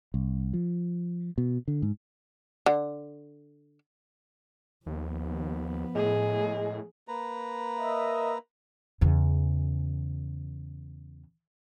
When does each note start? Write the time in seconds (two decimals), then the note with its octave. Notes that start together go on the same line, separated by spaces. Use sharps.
0.14 C2
0.53 F3
1.38 B2
1.68 D3
1.82 G#2
2.66 D3
4.86 D#2 F3 B3
5.95 A2 G#3 G#4
7.08 A#3 B4 A#5
7.79 A#4 D#5 E5
9.01 E2 C#3